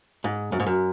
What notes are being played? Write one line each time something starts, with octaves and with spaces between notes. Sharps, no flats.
G#2
F#2
G#2
F#2